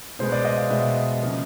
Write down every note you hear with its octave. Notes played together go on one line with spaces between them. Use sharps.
B2 G#3 B3 C5
D5
D#5
F5
B2 G#3 B3 E5
C#3 F3 A#3